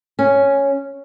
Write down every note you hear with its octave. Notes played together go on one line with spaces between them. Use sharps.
C#4